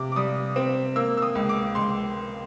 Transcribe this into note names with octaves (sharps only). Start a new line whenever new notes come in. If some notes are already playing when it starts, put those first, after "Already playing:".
Already playing: C3 D6
D6
G3 D#6
C4
A#3 E6
E6
D#6
C#2
D6
C#2 C6